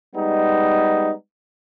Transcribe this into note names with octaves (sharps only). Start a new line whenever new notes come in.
G3 G#3 B3 D#4